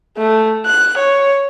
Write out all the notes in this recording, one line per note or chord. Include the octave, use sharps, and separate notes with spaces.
A3
F#6
C#5